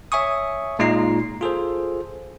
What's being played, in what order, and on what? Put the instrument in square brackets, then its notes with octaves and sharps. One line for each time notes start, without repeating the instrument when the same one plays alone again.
[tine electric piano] C#5 E5 G#5 C#6 D#6
A#2 G#3 D#4 F4 A#5 C7
F4 G#4 A4 C5